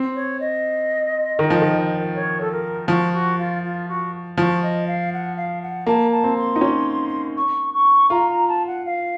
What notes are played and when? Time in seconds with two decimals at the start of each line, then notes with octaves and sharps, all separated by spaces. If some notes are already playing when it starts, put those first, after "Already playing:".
Already playing: C4
0.14 C#5
0.40 D#5
1.39 D#3
1.50 F3
1.62 D#3
2.14 C#5
2.40 A4
2.51 A#4
2.88 F3 F#4
3.13 F#4
3.38 F4
3.63 F4
3.88 F#4
4.37 F3 F#4
4.62 D#5
4.87 F5
5.13 F#5
5.36 F5
5.62 F#5
5.86 A#3 A5
6.11 A5
6.24 C4
6.37 C6
6.56 D#4
6.61 C#4
7.36 C#6
7.73 C#6
8.10 F4 A#5
8.29 A#5
8.48 A5
8.66 F#5
8.85 F5